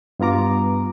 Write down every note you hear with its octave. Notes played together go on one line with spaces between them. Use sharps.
G2 B3 F4 A#5 D6